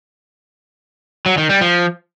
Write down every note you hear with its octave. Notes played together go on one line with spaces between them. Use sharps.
F#3
D#3
G3
F3